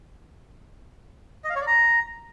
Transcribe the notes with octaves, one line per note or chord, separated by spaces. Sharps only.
D#5
F5
C#5
D5
A#5